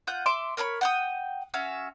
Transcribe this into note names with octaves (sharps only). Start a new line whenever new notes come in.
F4 F#5 G6
E5 C6 D6
A#4 C#5 A#5 B5
F#5 G5 D#6
C#4 F#4 E5 F5